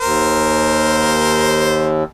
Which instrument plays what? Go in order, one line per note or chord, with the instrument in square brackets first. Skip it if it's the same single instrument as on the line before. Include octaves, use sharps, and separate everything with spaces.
[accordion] D#2 [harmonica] A#4 C5